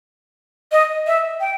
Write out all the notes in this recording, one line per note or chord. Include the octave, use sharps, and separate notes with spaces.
D#5
E5
G5